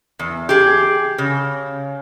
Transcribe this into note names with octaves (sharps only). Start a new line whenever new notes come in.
E2
G4 G#4
C#3